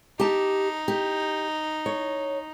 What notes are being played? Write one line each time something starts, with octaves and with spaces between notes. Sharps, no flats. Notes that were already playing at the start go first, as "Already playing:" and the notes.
D#4 G4 A5
G4
C#5